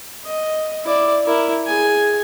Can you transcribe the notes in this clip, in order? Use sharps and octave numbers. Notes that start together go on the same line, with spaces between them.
D#5
E4 D5
E4 A#4
G#4 G#5